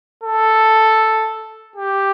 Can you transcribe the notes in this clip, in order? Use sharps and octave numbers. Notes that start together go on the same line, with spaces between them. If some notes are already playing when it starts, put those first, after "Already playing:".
A4
G4